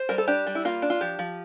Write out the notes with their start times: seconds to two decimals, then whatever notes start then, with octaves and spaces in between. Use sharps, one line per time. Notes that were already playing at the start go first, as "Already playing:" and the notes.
Already playing: C5
0.09 G3 A#4
0.18 A4
0.27 D4 G4
0.47 G3
0.55 E4
0.65 A#3 F4
0.82 D4
0.90 F4
1.01 F3 G4
1.19 F3